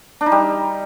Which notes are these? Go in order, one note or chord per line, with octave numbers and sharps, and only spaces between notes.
D4
D#4
G3